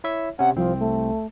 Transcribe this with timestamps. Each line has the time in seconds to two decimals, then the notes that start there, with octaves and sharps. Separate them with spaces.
0.04 E4 C#5 E5
0.39 C3 C#4 F#5
0.56 C2 F3 C4
0.80 A3